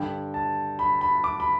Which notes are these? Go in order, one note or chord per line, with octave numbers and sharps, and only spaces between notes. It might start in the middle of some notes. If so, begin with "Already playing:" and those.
Already playing: G2 D3 G5
A5
B5
B5
D6
B5